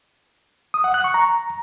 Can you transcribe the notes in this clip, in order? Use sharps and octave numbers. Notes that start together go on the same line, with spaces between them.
D#6
F#5
F#6
C#6
A#5